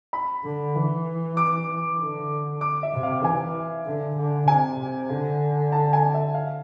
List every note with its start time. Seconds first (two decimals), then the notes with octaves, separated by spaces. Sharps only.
0.13 B5
0.44 D3
0.75 E3
1.37 D6
2.00 D3
2.61 D6
2.83 E5
2.93 C3
3.03 F5
3.24 E3 G#5
3.86 D3
4.17 D3
4.48 C3 G#5
4.79 C3
5.10 D3
5.72 A5
5.93 G#5
6.14 E5
6.34 F5